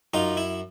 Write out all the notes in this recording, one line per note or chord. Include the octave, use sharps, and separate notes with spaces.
F#2 D#4 F4
E4